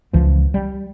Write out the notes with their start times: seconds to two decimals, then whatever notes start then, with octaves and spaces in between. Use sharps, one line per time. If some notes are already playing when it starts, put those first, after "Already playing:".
0.13 C#2 E3 F3
0.54 G3